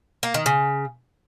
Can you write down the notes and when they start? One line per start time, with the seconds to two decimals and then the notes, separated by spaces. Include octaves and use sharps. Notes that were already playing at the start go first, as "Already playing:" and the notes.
0.23 A#3
0.34 D#3
0.46 C#3